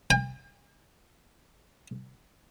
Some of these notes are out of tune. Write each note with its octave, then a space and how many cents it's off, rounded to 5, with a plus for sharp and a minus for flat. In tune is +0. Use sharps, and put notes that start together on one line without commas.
G5 +45